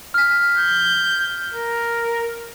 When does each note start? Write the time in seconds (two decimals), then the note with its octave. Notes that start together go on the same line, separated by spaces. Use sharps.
0.14 F6 B6
0.58 G6
1.54 A#4